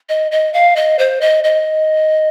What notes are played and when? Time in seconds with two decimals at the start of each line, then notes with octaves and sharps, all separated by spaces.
0.09 D#5
0.32 D#5
0.54 F5
0.76 D#5
0.99 C5
1.21 D#5
1.44 D#5